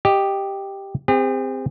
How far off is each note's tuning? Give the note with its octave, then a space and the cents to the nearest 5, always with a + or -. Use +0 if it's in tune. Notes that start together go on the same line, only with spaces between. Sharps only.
G4 +0 D#5 +0
C4 -15 G#4 -45